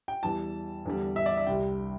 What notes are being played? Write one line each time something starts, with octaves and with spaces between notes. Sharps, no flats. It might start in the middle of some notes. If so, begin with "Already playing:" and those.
G5
E2 E3 G3 A5
E2 D3 G3
E5
D5
E5
C2 C3 G3 G5